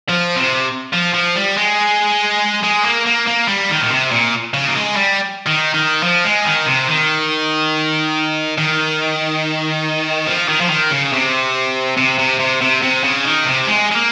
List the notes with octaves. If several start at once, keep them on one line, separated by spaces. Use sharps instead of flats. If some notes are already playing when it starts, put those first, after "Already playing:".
F3
C3
F3
F3
G3
G#3
G#3
A#3
A#3
A#3
G3
D#3
A#2
C3
A#2
C#3
A#3
G#3
G3
D#3
D#3
F3
G#3
D#3
C3
D#3
D#3
F3
D#3
F3
D#3
C#3
C3
C3
C3
C3
C3
C3
C#3
D#3
C3
G#3
G#3
A#3